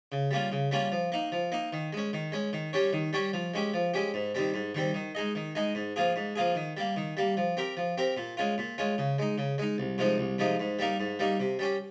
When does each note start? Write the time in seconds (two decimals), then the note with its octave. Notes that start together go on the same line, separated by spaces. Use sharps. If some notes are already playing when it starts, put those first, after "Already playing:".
0.12 C#3
0.31 G3 A#3 C#4 F4
0.52 C#3
0.71 G3 A#3 C#4 F4
0.92 F3
1.12 A#3 D#4
1.32 F3
1.52 A#3 D#4
1.73 D#3
1.93 G#3 C#4
2.13 D#3
2.32 G#3 C#4
2.53 D#3
2.73 G3 C#4 G4 C#5
2.93 D#3
3.13 G3 C#4 G4 C#5
3.33 F3
3.54 G#3 C#4 G4
3.74 F3
3.94 G#3 C#4 G4
4.14 G#2
4.35 D#3 G3 C4
4.54 G#2
4.75 D#3 G3 C4
4.94 D#3
5.15 G#3 D#4 G#4 D#5
5.35 D#3
5.55 G#3 D#4 G#4 D#5
5.75 G#2
5.96 F3 A#3 F4 G#4
6.16 G#2
6.36 F3 A#3 F4 G#4
6.55 D#3
6.77 G3 A#3
6.96 D#3
7.17 G3 A#3
7.37 F3
7.57 C4 G4 A#4
7.77 F3
7.98 C4 G4 A#4
8.17 A#2
8.37 G#3 C#4 F4
8.58 A#2
8.78 G#3 C#4 F4
8.98 C#3
9.18 G#3 D#4
9.38 C#3
9.58 G#3 D#4
9.78 C2
9.98 C3 F3 G#3 D#4
10.18 C2
10.38 C3 F3 G#3 D#4
10.60 G#2
10.79 G3 A#3 D#4 A#4
11.00 G#2
11.19 G3 A#3 D#4 A#4
11.40 C3
11.59 G3 C#4 G4